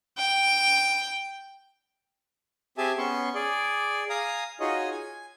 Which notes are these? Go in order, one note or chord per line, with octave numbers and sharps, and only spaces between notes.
G5
C4 G4 G#4 E5 G#5 A5
B3 C#4 C6 C#6
G#4 D5
F5 G#5 A#5 D#6
D#4 F4 F#4 G#4 C#5 D#5
G#5